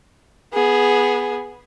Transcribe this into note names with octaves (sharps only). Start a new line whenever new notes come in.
B3 G#4